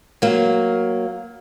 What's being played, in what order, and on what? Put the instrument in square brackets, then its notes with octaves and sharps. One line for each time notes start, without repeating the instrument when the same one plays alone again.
[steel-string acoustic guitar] F#3 A#3